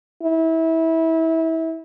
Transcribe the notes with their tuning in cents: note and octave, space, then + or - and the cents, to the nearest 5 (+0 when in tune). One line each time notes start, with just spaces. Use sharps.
E4 -25